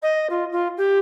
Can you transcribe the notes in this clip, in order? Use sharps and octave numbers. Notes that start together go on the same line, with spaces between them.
D#5
F4
F4
G4